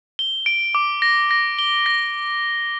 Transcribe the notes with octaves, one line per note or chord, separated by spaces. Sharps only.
G7
D7
D6
A#6
A#6
G7
A#6